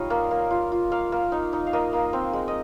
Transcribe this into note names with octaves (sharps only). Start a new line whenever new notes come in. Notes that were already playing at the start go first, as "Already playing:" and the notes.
Already playing: G3 D#4 F4 C#5 D#5 F5
A#3
A#3
F4
F4
A#3 F5
A#3
D#4
D#4
F5
A#3 D#5
A#3
C4
G#3
D#5